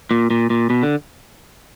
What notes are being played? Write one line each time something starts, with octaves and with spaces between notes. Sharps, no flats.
A#2
A#2
A#2
B2
D3